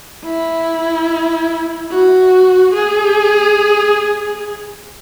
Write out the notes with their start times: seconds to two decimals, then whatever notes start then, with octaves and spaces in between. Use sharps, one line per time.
0.24 E4
1.91 F#4
2.74 G#4